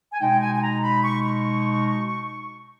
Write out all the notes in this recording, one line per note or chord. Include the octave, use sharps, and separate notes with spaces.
G#5
B2 G#3 D#4 G5
G#5
G#5
A#5
B5
C#6
C#6